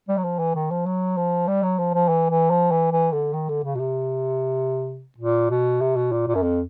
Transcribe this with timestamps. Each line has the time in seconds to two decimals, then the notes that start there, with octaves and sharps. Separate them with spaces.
0.09 G3
0.18 F#3
0.24 F3
0.39 E3
0.55 D#3
0.71 F3
0.86 F#3
1.17 F3
1.48 G3
1.63 F#3
1.79 F3
1.94 F3
2.09 E3
2.30 E3
2.50 F3
2.71 E3
2.92 E3
3.12 D3
3.33 D#3
3.49 D3
3.64 C#3
3.75 B2
3.80 C3
5.18 A#2
5.50 B2
5.81 C3
5.96 B2
6.12 A#2
6.28 A#2
6.35 F#2
6.42 F2